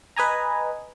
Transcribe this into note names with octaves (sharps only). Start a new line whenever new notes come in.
B4 D#5 G#5 A#5